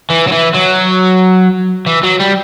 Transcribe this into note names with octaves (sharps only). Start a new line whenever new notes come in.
E3
F#3
E3
F#3
E3
F#3
G3